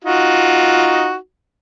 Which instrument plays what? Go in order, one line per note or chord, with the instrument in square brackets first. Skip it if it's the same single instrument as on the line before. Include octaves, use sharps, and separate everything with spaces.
[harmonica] D#4 F4 F#4